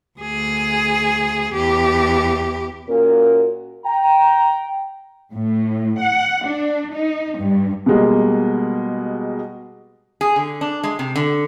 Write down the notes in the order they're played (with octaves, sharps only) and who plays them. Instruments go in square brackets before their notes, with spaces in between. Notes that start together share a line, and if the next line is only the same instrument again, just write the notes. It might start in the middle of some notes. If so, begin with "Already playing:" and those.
[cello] D2 G#4
E2 G4
[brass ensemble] A#2 A#3 C#4 F#4 A#4
G5 A#5
[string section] A2
F#5
D4
D#4
G2
[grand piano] B2 G3 G#3 A#3
[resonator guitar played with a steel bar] G#4
D3
D4
G#3
C3
D3